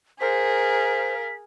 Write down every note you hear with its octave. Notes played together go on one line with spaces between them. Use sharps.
G#4 A#4 C5 F5 B6